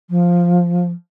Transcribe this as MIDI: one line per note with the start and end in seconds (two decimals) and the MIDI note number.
0.10 0.91 53